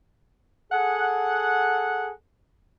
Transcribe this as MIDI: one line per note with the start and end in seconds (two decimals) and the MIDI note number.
0.72 2.10 68
0.72 2.10 69
0.72 2.10 78